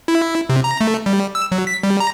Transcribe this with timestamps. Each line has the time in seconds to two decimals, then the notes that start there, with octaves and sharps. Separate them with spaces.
0.08 E4
0.49 C3
0.64 A#5
0.81 A3
1.06 G3
1.35 E6
1.52 F#3
1.67 B6
1.83 G3
2.00 A#5